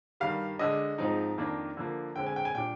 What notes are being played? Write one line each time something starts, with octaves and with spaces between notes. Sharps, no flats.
G2 D#3 G3 F5
D3 G#3 D4 D#5
G#2 F3 C4 D#4
F2 D#3 A#3 D4
D3 F3 A#3
D3 G#3 C4 G5
G#5
G5
G#5
A#2 G3 D4 G5